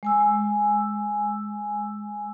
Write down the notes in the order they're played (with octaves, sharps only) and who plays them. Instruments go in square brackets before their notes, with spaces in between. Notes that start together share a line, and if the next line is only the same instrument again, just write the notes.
[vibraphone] G#3 G#5 E6